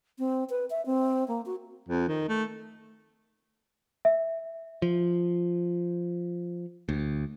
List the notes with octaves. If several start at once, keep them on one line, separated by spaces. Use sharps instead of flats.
C4
B4
E5
C4
A#3
F#4
F2
D#3
A3
E5
F3
D2